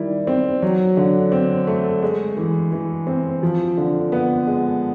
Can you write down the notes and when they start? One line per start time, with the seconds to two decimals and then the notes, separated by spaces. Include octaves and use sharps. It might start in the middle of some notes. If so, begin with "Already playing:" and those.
Already playing: D#3 G3 E4
0.27 C4
0.62 F#3
0.97 D3
1.32 C4
1.67 A3
2.02 G#3
2.37 E3
2.72 E3
3.07 C4
3.43 F3
3.78 D3
4.12 B3
4.47 G#3